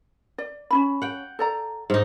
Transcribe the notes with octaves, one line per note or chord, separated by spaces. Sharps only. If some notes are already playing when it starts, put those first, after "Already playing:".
D5
C#4 D#4 B5
F#5 G5
A4 D5 A#5
G#2 D#4